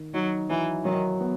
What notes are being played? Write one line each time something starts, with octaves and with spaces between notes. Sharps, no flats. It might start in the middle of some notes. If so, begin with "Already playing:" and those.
Already playing: D#3
F#3 D#4
E3 F#3
D#3 F#3
B3